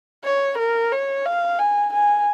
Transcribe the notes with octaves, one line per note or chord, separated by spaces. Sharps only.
C#5
A#4
C#5
F5
G#5
G#5